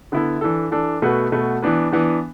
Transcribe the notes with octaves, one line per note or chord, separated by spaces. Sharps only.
D3 B3 E4 A4
E3 D4 A4
E3 D4 A4
B2 A3 F#4 B4
B2 A3 F#4 B4
E3 B3 D4 B4
E3 B3 D4 B4